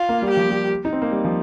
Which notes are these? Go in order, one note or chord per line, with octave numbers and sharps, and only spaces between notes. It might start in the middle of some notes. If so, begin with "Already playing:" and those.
Already playing: F4
A#3
G3
G4
F3
G3
D#4
C4
A#3
G3
F3